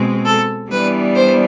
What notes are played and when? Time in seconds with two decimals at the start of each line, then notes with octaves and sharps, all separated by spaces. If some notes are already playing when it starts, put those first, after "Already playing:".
Already playing: B2 G#3 C4
0.26 A4
0.71 E3 G3 B3 D4 B4
1.16 C5